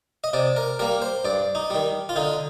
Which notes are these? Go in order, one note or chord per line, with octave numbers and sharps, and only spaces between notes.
D#5
C3 D5
A#4
G3 A#3 A#4
C5
G2 D5
D#4
D#3 G3
F4
D3 D#4